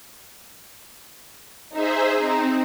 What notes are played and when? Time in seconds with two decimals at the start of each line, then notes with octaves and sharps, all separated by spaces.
1.73 D#4 G#4 C5 E5
2.20 C4 D#4